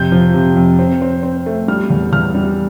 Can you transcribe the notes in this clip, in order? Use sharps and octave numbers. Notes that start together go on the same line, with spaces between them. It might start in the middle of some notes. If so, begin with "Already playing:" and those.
Already playing: F2 C3 G6
F3
C3
F2
C4
C4
C4
A3
G3 F6
E2
E2 F6
G3